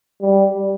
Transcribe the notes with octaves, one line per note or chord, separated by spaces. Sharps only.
G3